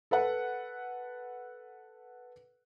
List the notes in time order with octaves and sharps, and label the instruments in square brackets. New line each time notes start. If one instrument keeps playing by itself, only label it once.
[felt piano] A4 B4 F#5